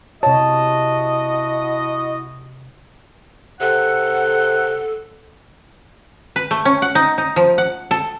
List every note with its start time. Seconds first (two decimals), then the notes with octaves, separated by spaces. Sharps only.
0.23 C3 E4 F#4 C#5 D#5 A5
3.61 C3 A4 F#5
6.36 B4
6.51 A3
6.65 C#4
6.82 F#5
6.95 D#4
7.18 D#4
7.36 F3
7.58 F#5
7.91 A4